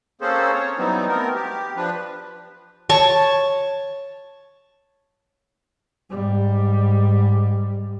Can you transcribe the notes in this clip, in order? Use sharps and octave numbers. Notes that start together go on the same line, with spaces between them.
A#3 C4 C#4 G#4 A4 C5
C#5
E3 F#3 G3 B3 C4 D#4
A3 B3 C4 A#4
G4
F3 D4 B4
C#5 A5 C#6
G#2 G3